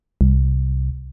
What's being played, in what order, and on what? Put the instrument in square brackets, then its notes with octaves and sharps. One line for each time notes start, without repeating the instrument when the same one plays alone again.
[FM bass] C2